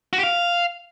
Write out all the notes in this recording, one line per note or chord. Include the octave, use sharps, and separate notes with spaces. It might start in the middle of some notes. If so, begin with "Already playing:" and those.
F#4
G4
F5